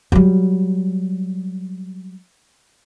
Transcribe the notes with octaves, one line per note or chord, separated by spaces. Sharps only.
F#3 G3